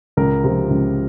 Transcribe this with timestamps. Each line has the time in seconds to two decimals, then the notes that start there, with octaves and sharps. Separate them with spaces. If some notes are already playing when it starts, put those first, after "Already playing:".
0.17 C#2 A#4
0.44 C3 F3
0.70 C#2